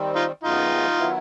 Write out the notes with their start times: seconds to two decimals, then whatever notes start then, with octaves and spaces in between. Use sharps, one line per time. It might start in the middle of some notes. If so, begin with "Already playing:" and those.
Already playing: D#3 G3 C4
0.16 D#4 F4
0.43 F#2 D#3 G#3 B3 D#4 F4
0.98 D#3 F#3 B3 E4